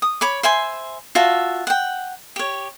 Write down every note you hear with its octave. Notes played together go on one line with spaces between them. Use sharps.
D#6
C#5 B5 D6
C5 E5 G#5 C6
F4 F#4 E5 A5
F#5 G5
G4 C#5